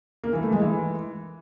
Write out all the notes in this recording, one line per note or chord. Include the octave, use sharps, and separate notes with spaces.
A#3
E3
A3
G#3
E3